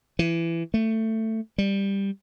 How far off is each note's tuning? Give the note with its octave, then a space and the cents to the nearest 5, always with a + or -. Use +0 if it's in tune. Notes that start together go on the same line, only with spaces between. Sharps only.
E3 +20
A3 +15
G3 +10